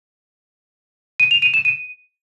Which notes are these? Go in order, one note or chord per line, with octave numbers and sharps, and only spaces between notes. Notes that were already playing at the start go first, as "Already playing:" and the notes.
D#7
F7
D#7
E7
D#7